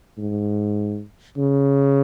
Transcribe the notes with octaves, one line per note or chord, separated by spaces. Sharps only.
G#2
C#3